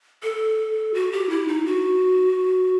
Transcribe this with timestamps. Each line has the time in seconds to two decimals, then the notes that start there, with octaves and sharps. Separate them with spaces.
0.23 A4
0.94 F#4
1.12 G4
1.30 E4
1.48 D#4
1.66 F#4